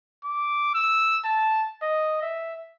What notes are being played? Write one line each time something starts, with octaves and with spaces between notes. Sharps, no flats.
D6
E6
A5
D#5
E5